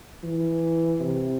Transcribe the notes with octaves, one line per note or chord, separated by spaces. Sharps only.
E3
C3